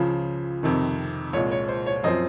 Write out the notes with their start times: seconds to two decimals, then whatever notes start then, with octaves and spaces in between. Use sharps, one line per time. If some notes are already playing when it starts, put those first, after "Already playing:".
Already playing: C#2 C#3 F3
0.63 F2 C3 D#3
1.33 C2 A#2 G#3 C#5
1.51 C#5
1.69 C5
1.86 C#5
2.04 F#2 F3 C4 D#5